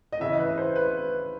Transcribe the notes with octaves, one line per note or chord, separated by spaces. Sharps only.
D#5
C#3 E3 E5
B4
C5
B4